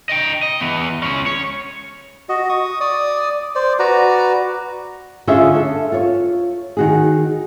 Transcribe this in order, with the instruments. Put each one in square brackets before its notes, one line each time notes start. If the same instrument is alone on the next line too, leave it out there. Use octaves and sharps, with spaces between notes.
[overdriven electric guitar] D#5 G5
D#5
E3 B3
G#3 C#4
C#5
[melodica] F#4 D#5
C#6 D#6
D5 D#6
C5 D5
F#4 B4 D5 A#5
[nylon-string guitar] D3 C#4 F4 G#4 D#5 E5
A4
F4 C#5
D#3 F#4 G#4